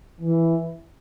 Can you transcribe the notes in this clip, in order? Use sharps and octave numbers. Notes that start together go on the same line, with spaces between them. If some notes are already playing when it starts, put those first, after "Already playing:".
E3